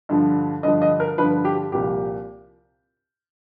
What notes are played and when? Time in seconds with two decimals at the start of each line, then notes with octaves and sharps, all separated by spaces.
0.09 G2 D3 F3
0.63 G2 D3 F3 D#5
0.82 D#5
1.00 A#4
1.18 G2 D3 F3 B4
1.45 G4
1.72 C2 A#2 F3 G4